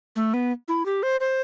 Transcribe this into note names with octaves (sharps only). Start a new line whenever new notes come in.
A3
B3
E4
G4
C5
C5